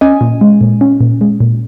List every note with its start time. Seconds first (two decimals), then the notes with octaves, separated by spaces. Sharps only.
0.01 C#4 D#5 G#5
0.21 A#2
0.41 G#3
0.61 A#2
0.81 C#4
1.01 A#2
1.21 G#3
1.40 A#2